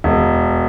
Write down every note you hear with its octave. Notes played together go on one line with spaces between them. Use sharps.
E1